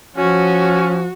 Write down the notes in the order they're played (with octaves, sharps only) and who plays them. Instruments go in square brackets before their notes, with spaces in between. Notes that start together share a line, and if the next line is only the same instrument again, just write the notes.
[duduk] F3 [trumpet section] C#4 [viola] F#4